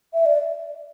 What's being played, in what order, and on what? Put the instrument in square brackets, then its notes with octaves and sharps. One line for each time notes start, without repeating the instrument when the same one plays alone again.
[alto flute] E5
D5